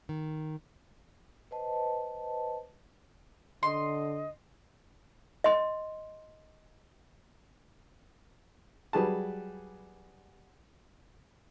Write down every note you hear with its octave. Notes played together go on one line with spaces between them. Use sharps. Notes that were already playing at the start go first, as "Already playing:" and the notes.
D#3
B4 C5 D#5 A5
D3 D#5 C6
D#5 C6
F#3 G3 G#4 B4 A5